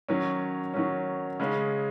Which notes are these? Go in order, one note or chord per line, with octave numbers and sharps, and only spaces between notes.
D#3 F#3 C#4
D#3 F#3 C#4
C#3 G#3 C#4